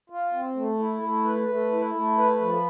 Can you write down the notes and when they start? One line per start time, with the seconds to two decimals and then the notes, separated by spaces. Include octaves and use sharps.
0.10 F4
0.33 C4
0.56 A3
0.79 E4
1.02 A3
1.25 B4
1.48 A3
1.72 E4
1.95 A3
2.18 B4
2.41 F3